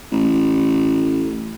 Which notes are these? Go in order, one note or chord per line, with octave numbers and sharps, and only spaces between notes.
A1